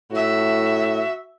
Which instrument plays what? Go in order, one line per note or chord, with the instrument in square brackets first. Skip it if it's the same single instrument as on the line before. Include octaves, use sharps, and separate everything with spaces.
[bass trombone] A2 [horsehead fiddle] F#4 E5